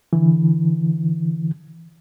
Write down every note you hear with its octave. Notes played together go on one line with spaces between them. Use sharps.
D3 E3